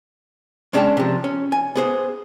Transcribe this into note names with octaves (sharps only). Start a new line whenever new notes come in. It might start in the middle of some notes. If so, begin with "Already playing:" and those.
G#3 C#4 D4 F5 G5 A5
C3 F3
C#4
G#5
B3 G#4 C5